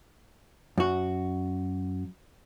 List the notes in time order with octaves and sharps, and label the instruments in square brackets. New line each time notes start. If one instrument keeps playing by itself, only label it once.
[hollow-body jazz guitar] F#2 F#4